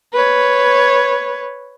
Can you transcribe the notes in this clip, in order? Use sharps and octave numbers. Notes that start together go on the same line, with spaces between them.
B4 C#5